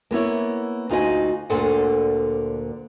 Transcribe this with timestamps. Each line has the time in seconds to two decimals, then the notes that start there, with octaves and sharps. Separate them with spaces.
0.11 A#3 B3 E4 C#5
0.89 D2 D#4 F4 F#4 D#5 G#5
1.50 D2 A#2 D3 A4 C5 F#5